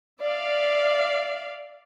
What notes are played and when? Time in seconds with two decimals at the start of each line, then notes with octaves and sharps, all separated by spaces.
0.21 D5 E5 F5